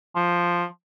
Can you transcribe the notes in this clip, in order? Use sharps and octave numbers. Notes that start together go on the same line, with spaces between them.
F3